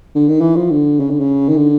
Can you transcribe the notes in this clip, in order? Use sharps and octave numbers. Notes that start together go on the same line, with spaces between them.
D3
D#3
E3
F3
D3
C#3
D3
C#3
D#3
D3